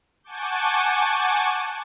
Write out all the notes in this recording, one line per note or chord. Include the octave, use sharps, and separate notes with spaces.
F#5 G#5 A5 C#6 D6 G6